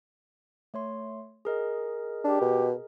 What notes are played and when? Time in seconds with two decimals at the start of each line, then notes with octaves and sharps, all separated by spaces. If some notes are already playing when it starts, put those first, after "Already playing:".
0.74 A3 C#5 C6
1.45 G#4 A#4 D#5
2.24 D4 G4
2.41 B2